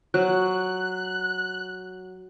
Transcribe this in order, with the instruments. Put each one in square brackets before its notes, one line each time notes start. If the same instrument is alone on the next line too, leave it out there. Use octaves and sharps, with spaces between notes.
[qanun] F#3 [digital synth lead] F#6